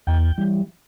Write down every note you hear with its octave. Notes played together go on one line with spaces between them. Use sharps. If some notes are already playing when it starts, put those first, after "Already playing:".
E2 G5
E3 G3